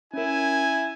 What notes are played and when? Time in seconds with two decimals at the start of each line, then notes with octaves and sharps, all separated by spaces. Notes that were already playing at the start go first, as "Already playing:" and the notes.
0.13 C#4 E4 A#4 G#5